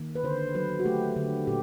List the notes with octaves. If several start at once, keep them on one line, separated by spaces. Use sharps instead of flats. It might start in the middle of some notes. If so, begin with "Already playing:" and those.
Already playing: D#3 A#3
B4
D3 C5
F#3 B4
F#4
A3 G4
D3
A#2 G4